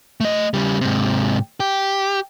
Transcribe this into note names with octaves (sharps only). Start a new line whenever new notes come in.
A3 D#5
C#3 G3
G#2 C3
G4